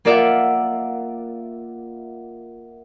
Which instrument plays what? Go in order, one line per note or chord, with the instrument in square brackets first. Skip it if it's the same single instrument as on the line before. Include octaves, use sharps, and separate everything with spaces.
[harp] A#3 F4 A#4 D5 E5 F#5